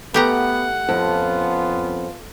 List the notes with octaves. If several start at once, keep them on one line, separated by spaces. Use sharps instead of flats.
A3 B3 G4 F#5 A#5
F2 B3 C#4 F4